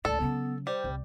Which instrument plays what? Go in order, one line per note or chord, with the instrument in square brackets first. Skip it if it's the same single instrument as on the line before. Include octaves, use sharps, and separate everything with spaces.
[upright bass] C#2 A2 [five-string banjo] A4 [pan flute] D5
[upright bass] C#3 F#3 [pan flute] B3
[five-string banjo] G3 [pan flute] C5
[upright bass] C2